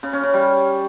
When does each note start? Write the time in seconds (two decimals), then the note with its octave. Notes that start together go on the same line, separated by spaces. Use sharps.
0.03 C#3
0.13 C#4
0.23 C#3
0.34 G3